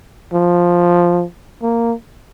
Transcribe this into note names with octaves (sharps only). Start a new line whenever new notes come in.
F3
A#3